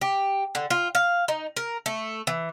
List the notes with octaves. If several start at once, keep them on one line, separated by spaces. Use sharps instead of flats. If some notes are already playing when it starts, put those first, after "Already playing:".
G4
D3
F4
F5
D#4
A#4
A3
E3